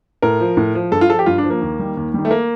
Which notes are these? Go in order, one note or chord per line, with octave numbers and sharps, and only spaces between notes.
A2 A#4
F3
A2
F3
G2 A4
F4
F3 A4
G4
G2 F4
D4
F3
A#3
D#2
D#3 G3
D#2
D#3 G3
A3
A#3